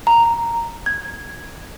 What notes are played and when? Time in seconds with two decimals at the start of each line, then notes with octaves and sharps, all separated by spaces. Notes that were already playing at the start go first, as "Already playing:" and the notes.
0.07 A#5
0.86 G#6